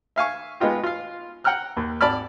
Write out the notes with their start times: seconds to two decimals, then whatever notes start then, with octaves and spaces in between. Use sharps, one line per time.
0.16 E5 F5 G#5 C#6
0.60 G#3 B3 D#4 F4 G4
0.83 F4 F5
1.44 F#5 G5 A#5 F6 F#6
1.77 D#2
2.01 G#1 D5 A5 B5 F6